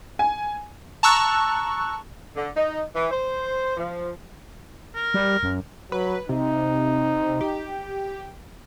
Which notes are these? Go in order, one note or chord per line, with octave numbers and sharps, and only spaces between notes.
G#5
A5 A#5 C#6 E6 F#6
D3
D#4
E3
C5
F3
A#4
G3
F#2
F#3 B4
C3 D#4
G4